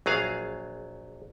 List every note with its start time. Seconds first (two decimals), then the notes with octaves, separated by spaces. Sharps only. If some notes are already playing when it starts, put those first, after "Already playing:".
0.06 A#1 F#3 G#4 F5